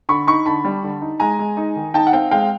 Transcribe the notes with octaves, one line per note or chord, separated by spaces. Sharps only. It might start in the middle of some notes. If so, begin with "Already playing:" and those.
D3 B5 C#6
D#4 B5 C#6
D3 A5 B5
G3
D3
D#4
G#3 G#5 A#5
G#3
D#4
D#3
D#4 G5 A5
F#5
C4 F5 G5
G#3 F5 G5